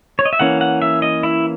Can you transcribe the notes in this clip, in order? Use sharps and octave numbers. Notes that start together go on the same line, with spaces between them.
C#5
D#5
E5
E3 A#3 C#4 F#5
F#5
E5
D#5
E4